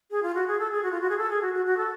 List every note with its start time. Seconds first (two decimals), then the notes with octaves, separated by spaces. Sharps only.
0.11 G#4
0.23 F4
0.34 F#4
0.47 G#4
0.59 A4
0.71 G#4
0.83 F#4
0.91 F4
1.01 F#4
1.09 G#4
1.18 A4
1.30 G#4
1.42 F#4
1.54 F#4
1.65 F#4
1.77 A4